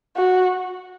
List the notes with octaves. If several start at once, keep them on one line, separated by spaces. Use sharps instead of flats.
F#4